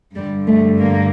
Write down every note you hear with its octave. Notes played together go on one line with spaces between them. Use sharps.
G2 D3 G3
A3
A#3